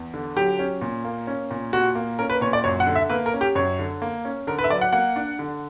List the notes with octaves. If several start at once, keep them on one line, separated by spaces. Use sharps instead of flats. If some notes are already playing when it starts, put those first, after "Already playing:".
Already playing: E2
D3
F#3 G4
C#4
A#2
A#3
C#4
A#2
A#2 F#4
A#3
C#4 A#4
B4
A#2 C#5
D5
F#2 C#5
F#5
D3
E5
A#3 B4
A#4
C#4
G4
F#2 C#5
D3
A#3
C#4
D3 A#4
B4
E5
F#3 D5
F#5
A#3 F#5
D4
D3